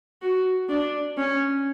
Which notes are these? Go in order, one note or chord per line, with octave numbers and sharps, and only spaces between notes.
F#4
D4
C#4